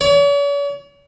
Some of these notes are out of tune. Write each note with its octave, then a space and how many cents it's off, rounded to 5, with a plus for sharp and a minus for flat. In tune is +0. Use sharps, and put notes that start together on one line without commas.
C#5 +45